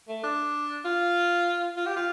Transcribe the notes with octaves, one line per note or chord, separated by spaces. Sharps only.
A3
D4
F4
F4
G4
F4